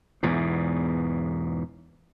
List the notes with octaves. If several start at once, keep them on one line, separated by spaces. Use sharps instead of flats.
E2 G#2 B2